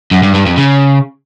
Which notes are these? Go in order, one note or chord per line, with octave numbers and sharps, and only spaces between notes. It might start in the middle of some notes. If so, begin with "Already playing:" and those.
F#2
G2
G2
F2
C#3